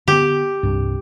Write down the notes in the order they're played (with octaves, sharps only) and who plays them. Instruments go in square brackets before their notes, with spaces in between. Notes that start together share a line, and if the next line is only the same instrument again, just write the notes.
[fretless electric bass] D3 B3 [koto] G4
[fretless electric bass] C2 G2